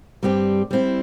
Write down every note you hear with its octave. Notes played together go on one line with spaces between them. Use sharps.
G2 G3 C4 G4
G3 C4 E4